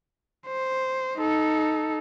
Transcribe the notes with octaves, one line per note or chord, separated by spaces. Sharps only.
C5
D#4 A4